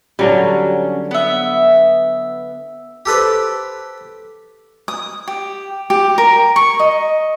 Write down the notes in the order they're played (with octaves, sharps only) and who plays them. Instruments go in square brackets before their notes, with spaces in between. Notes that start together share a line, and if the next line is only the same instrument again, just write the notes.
[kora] D3 F#3 G3 [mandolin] C#4
[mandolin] B3 E5
[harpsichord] G4 A4 B4 C5
[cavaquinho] D#6
G4
G4
A#4
C#6
D#5